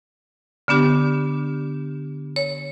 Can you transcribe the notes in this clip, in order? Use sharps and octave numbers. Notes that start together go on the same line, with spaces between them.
D3 B3 D4 G4
C#5